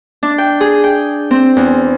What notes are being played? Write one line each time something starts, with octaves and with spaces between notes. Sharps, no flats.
D4
G5
G#4
G5
C4
E2